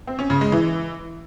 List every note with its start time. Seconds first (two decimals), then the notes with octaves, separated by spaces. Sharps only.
0.07 C4
0.19 C#4
0.30 C#3
0.41 G#3
0.52 E3